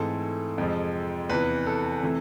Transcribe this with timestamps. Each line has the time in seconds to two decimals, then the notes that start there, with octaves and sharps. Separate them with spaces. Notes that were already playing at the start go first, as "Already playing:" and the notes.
Already playing: G#2 E3 A3 C4 A4
0.58 F2 C3 F3 G#3
1.29 E2 C3 E3 B4
1.67 A4
2.02 C3 E3 A3